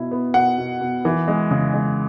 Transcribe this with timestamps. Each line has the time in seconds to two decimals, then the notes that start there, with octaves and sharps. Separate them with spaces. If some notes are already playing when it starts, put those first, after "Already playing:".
Already playing: B2 E4
0.11 B3
0.34 B2 F#5
0.58 B2
0.81 B2
1.05 E3
1.28 G#3
1.51 C#3
1.74 G#3